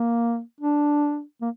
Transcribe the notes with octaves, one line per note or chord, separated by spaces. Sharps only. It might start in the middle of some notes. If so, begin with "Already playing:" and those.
Already playing: A#3
D4
A#3